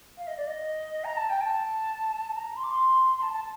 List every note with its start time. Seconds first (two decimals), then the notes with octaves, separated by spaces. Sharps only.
0.18 F5
0.27 D#5
0.37 D5
0.47 D#5
1.04 A#5
1.17 A5
1.29 G5
1.41 A5
2.35 A#5
2.56 C6
2.63 D6
2.71 C6
3.22 A5
3.33 A5